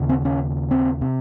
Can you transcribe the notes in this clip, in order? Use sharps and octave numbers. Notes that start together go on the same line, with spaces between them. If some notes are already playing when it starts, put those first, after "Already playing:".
Already playing: D#2 C#3
C4
C#4
C4
C3